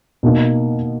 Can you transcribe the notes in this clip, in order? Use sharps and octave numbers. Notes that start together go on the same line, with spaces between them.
B2 A#3 D#4